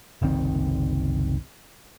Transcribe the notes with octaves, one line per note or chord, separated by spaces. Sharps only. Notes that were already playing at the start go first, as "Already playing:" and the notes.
F#1 C2 D#3 C4